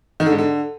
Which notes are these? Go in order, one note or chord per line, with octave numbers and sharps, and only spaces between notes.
D#3
D3
G#2
D3